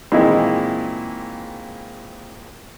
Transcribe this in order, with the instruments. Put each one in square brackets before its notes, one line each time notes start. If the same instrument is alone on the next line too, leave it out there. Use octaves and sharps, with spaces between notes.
[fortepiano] A#2 D#3 E3 G#3 C4 E4